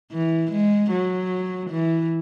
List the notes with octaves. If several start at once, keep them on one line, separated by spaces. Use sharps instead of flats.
E3
G#3
F#3
E3